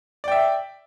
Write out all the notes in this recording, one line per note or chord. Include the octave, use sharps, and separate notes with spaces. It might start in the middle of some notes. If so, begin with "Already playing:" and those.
D5 E5 G5